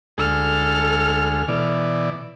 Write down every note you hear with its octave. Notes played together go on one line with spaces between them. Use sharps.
D2 G#3 A4 F6
B2 E3 D5